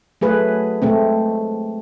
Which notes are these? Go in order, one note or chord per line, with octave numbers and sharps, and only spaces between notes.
F#3 A3 G#4 B4
G#3 A3 C4